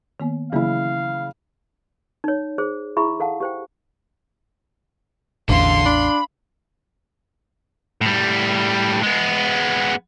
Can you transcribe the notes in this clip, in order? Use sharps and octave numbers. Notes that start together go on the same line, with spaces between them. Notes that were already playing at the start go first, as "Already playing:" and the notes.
D#3 A#3 B3
C#3 E3 F#3 A#3 E4 F5
D#4 C#5
G#4 C5
E4 G#4 E5 B5 C#6
A4 F5 F#5 A5
G4 C5 G5
A1 E2 D3 F5 C6
D4 B5
A2 G3
G#3 B3